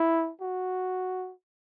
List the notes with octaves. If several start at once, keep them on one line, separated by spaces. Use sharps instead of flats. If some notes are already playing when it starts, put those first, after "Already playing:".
Already playing: E4
F#4